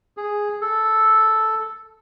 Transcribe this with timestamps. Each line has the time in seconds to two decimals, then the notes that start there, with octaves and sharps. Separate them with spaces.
0.17 G#4
0.61 A4